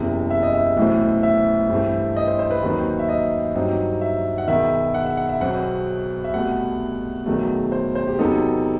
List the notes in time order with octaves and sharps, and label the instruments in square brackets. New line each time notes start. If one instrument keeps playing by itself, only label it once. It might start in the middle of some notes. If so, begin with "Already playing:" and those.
Already playing: [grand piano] F#1 E2 C3 E3 E5
E5
D#5
E5
B1 A2 E3 A3 C4
E5
G2 E3 A3 C4
D#5
C5
C5
B4
D#2 D#3 F#3 C4 D#4 B4
E5
D#5
G2 F#3 C4 D#4
E5
F#5
E1 E2 D#3 E5
F#5
E5
F#5
E5
B1 B2 F#3 C4 F#5
E5
C2 B2 A3 F#5
E1 E2 D#3 F#3 A3
C5
C5
G4
E2 C3 F#3 B3 D#4 A4